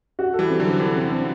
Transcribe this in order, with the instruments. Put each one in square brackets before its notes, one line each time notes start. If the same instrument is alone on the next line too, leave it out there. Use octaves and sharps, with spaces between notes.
[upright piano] F#4
A4
[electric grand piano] E3 G3
[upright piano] C4
[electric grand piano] D3 F#3 [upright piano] A4
[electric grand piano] C3 E3 [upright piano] A4
[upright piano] C4
C4